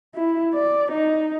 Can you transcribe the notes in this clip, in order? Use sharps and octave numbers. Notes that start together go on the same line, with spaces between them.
E4
D5
D#4